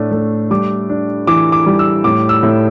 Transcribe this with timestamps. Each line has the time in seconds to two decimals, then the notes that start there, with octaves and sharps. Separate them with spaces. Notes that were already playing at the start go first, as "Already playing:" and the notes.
Already playing: A2 A3 D4
0.12 A3
0.51 G3 D6
0.89 D4
1.27 E3 D6
1.52 D6
1.66 G3
1.79 E6
2.04 A2 D6
2.29 E6
2.43 A2